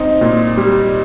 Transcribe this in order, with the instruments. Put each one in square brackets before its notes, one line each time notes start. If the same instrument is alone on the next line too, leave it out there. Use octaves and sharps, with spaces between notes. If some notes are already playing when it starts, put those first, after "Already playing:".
Already playing: [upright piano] C4 D#4
A#2
G3